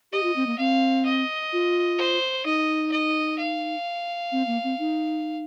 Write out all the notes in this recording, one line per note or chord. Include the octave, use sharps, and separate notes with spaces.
G4 D#5
F4
C4
A#3
C4 F5
D#5
F4
C5
D#4 D#5
D#5
F5
C4
A#3
C4
D#4